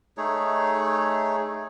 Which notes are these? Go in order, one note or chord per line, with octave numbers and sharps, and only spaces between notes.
A3 D#4 G#4 C#5